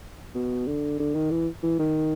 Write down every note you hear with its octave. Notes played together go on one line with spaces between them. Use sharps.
B2
D3
D3
D#3
E3
E3
D#3